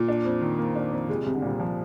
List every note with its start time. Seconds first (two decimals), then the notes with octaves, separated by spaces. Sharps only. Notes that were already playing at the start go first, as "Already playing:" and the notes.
Already playing: A#2
0.09 D4
0.25 F2
0.41 D#3
0.59 A#3
0.76 D4
0.92 F2
1.09 C3 G#3
1.22 C2 C3
1.34 D3
1.42 A#2 G3
1.60 F3